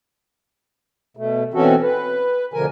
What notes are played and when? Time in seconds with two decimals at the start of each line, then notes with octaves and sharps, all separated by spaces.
1.17 B2 A3
1.54 B2 E3 C4 C#4 F#4 A4
1.82 B4
2.54 D2 B2 D3 F3 A#4 G#5